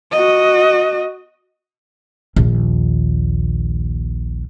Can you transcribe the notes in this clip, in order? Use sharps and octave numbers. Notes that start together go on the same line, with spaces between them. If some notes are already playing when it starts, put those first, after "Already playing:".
F#4 D#5
A#1 D#2